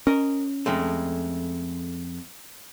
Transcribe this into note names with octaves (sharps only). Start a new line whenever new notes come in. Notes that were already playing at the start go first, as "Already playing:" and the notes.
C#4 A#4 D#5
F2 G#3 A3